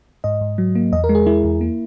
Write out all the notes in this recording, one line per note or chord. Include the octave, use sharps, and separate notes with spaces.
G#2 D#5
G#2
F#3
A#3
E2 D#5
A#4
G#3
G#4
G#3 E4
E2
A#3